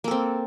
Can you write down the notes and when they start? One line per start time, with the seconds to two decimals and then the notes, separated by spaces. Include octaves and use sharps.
0.04 A#3
0.08 A4
0.11 C4